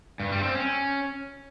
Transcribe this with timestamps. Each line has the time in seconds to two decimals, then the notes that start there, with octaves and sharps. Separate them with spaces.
0.20 G2
0.31 G3
0.43 C4
0.55 C#4